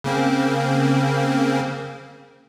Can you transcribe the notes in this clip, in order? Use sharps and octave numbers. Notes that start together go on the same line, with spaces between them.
C#3 A#3 C4